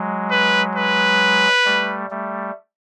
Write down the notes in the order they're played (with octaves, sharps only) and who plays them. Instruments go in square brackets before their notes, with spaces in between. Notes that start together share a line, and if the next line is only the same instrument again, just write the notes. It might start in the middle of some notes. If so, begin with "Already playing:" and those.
Already playing: [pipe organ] F#3 G#3
[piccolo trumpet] B4
B4
[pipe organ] G3 A3
G3 A3